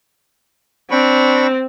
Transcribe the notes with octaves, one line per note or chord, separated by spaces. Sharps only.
C4 D4 B5 C#6